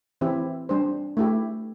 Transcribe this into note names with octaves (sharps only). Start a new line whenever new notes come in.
E3 C4 E4 G4
G3 D4 C5
A3 E4 G4